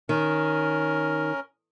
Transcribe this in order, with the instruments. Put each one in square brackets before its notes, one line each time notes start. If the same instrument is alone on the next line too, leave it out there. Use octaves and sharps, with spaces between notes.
[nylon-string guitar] D#3 [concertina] C#4 A#4